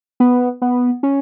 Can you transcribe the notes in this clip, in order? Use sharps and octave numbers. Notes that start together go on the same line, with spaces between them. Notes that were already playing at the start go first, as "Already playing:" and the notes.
B3
B3
C#4